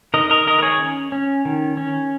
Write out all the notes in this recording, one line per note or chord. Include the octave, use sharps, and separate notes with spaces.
D#3 A#4 D#5
A#4 D#5
D#3 A#4 D#5
A#4
G#4 C#5
C#4
C#4
D#3
C#4